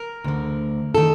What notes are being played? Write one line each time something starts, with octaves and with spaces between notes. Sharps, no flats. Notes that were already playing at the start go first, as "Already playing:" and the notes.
Already playing: A#4
D2 D3
D#3 A4